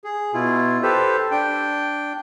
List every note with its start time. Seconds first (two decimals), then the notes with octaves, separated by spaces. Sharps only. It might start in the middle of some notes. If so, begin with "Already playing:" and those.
0.04 G#4
0.34 B2 E4 F4
0.83 G4 A4 B4 C5
1.31 D4 G5